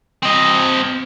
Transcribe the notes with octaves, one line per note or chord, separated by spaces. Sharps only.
C4 D#5